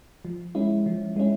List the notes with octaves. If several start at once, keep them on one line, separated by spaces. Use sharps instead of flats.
F3
G#3 C#4 E4
F3
G#3 C#4 E4